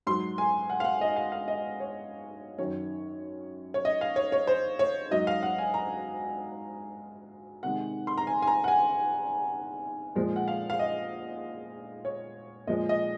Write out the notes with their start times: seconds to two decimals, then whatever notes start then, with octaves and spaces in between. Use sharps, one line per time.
0.07 G#2 F#3 C6
0.38 G#5
0.70 F#5
0.80 F5
0.85 F#5
1.01 D#5
1.16 F5
1.32 F5
1.48 D#5
1.80 C#5
2.58 F#2 D#3 F#3 C#5
3.74 C#5
3.85 D#5
4.01 F5
4.16 C#5
4.32 C#5
4.47 C5
4.79 C#5
5.11 G#2 F#3 D#5
5.27 F5
5.43 F#5
5.58 G#5
5.74 A#5
7.63 C3 D#3 G#3 F#5
8.07 C6
8.18 A#5
8.27 G#5
8.42 G#5
8.47 A#5
8.64 F#5
8.68 G#5
10.15 A#2 F3 G#3
10.36 F#5
10.48 F5
10.70 F5
10.79 D#5
12.05 C#5
12.67 A#2 F3 G#3 D#5
12.89 D#5